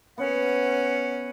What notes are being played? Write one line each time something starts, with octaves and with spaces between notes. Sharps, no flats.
B3 C#4 F#5